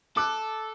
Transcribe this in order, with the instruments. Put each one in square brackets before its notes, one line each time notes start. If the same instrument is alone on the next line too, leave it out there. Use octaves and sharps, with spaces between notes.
[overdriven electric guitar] A4 [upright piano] D6 F#6